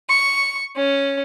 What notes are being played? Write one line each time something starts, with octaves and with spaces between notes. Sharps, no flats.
C#6
C#4